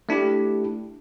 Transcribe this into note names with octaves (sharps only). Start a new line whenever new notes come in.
A3 D4 E4 G4